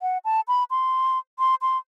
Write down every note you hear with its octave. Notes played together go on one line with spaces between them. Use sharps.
F#5
A5
B5
C6
C6
C6